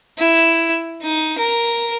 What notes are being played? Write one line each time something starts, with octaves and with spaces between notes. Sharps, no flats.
E4
D#4
A#4